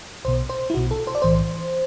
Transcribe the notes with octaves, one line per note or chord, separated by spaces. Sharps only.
B1 B2 C5
C5
E4
B1 B2 F#4
A4
C5
D5
B1 A2 E3 C5